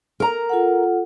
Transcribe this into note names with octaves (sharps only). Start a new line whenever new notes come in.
A#4 A#5
F4 A4 F#5